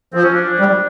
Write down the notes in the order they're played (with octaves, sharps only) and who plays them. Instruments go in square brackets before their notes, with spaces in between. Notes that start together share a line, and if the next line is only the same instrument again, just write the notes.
[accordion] F3 [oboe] C4
[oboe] C#4
D4
[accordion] G3